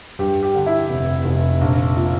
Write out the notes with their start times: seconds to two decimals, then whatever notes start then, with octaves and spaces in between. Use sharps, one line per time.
0.19 G2 G4
0.43 G4
0.55 D3
0.66 E4
0.90 F1
1.25 F1
1.61 A#1
1.96 A#2